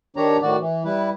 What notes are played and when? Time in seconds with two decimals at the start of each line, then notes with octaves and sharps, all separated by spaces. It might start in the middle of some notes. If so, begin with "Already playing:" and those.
0.16 D#3 D4 G4 C#5 A#5
0.42 A2 D#3 F#4 D5
0.60 E3
0.85 G3 E4 B4